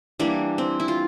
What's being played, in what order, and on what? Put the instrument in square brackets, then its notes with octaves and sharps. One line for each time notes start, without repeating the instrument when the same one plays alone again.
[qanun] E3 G3 A#3 D4
C4
E4
F4